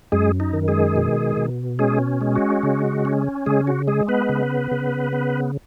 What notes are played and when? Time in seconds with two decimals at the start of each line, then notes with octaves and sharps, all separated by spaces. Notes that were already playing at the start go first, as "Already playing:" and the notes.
0.12 F#2 G#3 G#4
0.40 D#4
0.53 D#3
0.68 G#3 G#4
0.96 B2
1.37 B2
1.79 G#3 C#4 G#4
2.21 G#3
2.35 F#4
2.63 C#3
3.05 C#4
3.46 C#3 G#3 G#4
3.67 F#4
3.88 G#3 G#4
4.08 B3 B4
4.29 C#3
4.71 C#3
5.13 B3